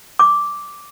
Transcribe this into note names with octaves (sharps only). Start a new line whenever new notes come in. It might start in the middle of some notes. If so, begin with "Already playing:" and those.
D6